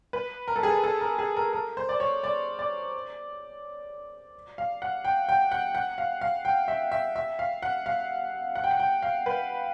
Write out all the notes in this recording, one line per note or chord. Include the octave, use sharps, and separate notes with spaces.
B4
A#4
A4
G#4
A4
A4
A#4
G#4
A#4
A#4
C5
D5
C#5
D5
D5
F5
F#5
G5
G5
F#5
F#5
F5
F5
G5
E5
E5
E5
F5
F#5
F5
F#5
G5
F#5
G5
F5
B4